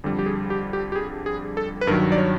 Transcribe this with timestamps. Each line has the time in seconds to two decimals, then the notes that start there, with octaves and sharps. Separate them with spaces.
0.04 F2 D3 G3
0.19 G4
0.26 G#4
0.50 G4
0.73 G4
0.92 G4
0.95 G#4
1.26 G#4
1.57 A4
1.81 B4
1.87 G2 D#3 F#3 A#4
2.12 D5
2.18 C#5